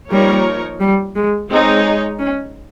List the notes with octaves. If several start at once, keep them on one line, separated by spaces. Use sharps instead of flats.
F3 G3 A#3 D#4 A#4 C#5
G3
G#3
G#3 C4 D#4 G#4 C#5
C#4